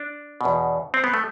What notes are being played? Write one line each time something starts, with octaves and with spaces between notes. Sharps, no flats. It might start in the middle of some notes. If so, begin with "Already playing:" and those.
Already playing: D4
E2 B2
C4
B3
A3